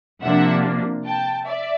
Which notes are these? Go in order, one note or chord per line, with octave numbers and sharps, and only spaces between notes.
C3 F3 A#3 D4 E5 F#5
G5 A5
D5 E5